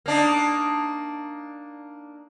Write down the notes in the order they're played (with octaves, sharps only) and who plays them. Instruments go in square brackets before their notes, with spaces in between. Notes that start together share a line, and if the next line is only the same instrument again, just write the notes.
[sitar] A#3 D4 D#4